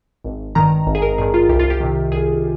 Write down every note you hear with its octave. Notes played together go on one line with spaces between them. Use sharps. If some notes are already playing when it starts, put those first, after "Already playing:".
G#1
G2 D#3 A#5
G#1
G#4
A#4
G2 D#3 G#4
F4
C2 G4
F4
G4
C3 D#3
C2 G#4